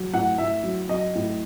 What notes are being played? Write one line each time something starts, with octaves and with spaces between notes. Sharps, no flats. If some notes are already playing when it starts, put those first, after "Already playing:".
Already playing: F#3
A2 F#5
A2 E5
F#3
F#3 D#5
A2